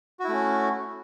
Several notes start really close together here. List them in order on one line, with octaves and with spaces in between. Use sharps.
F#4 E4 A3 C#4